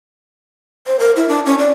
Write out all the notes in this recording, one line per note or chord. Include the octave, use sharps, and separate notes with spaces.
C5
A#4
E4
D4
C#4
D5